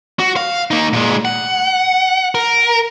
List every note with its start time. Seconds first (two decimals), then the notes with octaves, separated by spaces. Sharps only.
0.19 F#4
0.36 F5
0.71 A#3 D#4
0.93 A#2 G#3
1.25 F#5
2.35 A#4